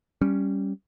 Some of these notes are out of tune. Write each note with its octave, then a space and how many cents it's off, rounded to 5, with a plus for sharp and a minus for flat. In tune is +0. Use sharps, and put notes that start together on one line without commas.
G3 +0 C#4 +0